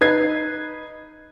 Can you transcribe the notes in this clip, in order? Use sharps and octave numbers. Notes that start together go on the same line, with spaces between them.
D#4 B4 G#6 C7